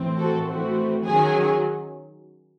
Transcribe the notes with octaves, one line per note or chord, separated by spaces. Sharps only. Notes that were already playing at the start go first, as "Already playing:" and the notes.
Already playing: A2 E3 C4
F#4 A4
E3 A3 C4 F#4
D#3 F#3 C#4 G#4